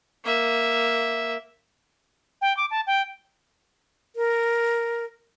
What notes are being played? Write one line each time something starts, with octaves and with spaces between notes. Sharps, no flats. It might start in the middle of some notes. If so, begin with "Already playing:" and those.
A#3 E5
G5
D6
A5
G5
A#4